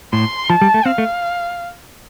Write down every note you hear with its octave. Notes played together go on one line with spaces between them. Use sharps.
A2 C6
F3 A5
G3
A3
C4 F5
A3